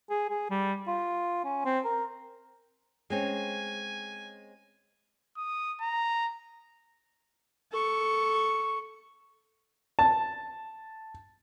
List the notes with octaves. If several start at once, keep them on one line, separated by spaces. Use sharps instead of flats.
G#4
G#4
G3
F4
C#4
C4
A#4
G#3 C4 C#4 G#5
D#6
A#5
A4 C#6
A5